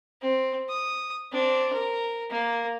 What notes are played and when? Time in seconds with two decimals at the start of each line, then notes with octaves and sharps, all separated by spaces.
0.22 C4
0.69 D#6
1.32 C4 D4
1.72 A#4
2.30 A#3